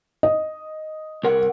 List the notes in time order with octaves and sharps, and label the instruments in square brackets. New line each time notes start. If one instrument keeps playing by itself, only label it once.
[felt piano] D#5
[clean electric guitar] C2 A#4 F#5